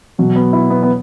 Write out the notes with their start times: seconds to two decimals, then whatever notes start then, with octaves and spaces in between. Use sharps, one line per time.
0.18 B2 F#3
0.36 B3
0.53 E4
0.70 B3
0.83 B3